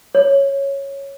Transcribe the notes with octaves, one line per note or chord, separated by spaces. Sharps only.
C#5